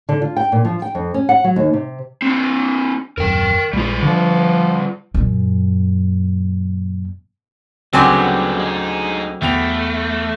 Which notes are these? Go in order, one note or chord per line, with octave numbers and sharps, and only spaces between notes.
D3
F4
G5
A#2
F3
G5
F2
C#4
F#5
F#3
D#2
C3
C4 D4
D#1 F#2 A#4 G5
A#1 G3 G#3 F4
D3 F3
F#2 A#2
D2 C#3 F#3 G3 B3 C4 G4 G#5
G#3 D#4
E2 A3 G5 F7